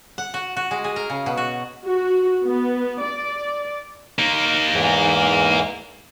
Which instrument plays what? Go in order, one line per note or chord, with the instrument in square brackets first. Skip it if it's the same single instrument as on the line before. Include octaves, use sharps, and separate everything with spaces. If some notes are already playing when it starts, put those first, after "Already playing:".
[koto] F#5
F#4
F#4
G#3
G#4
A#4
C#3
B2
F#4
[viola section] F#4
B3
D5
[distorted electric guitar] A#3 D#4
[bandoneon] E2 G#2 E3